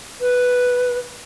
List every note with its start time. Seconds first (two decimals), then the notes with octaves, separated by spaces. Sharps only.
0.21 B4